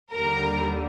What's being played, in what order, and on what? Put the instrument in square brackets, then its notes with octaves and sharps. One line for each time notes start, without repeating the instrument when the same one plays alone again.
[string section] D#2 D3 G3 A#4 A#5